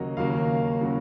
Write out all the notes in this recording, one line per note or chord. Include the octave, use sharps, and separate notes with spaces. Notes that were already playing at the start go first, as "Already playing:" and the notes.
Already playing: D#2 C#3 F#3 A#3 D#5
D#2 C#3 F#3 A#3 F5
C#3 F#3 A#3